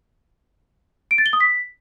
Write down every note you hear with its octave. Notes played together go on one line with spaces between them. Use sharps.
D7
A6
G7
D#6
B6